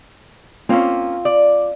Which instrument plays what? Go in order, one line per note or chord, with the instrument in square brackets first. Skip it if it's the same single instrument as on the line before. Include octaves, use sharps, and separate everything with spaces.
[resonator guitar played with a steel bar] A#3 C#4 [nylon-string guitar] C4 F4
[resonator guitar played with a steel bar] D5